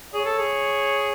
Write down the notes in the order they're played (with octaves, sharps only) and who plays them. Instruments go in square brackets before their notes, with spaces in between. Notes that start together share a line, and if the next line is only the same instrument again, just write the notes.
[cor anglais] G#4 [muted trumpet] C#5
[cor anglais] A4
G#4